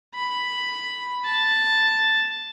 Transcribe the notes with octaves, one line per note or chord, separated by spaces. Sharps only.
B5
A5